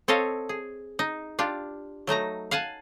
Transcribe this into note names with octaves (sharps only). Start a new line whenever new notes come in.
C4 A4 C#5 D#5 F5
G#4
D#4
D4 F4 G4
F#3 A3 D#4 A#5
F5 F#5 G#5 A5